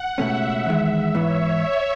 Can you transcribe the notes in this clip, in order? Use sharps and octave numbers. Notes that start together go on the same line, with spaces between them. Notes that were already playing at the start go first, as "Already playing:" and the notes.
Already playing: F#5
C#2 B2 A3 C#4 E5
E2 D#3 G#3
G#2 E3 B3 C#5